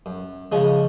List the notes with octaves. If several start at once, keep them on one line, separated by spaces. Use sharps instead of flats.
F#2
C#3 F3 G#3 C#4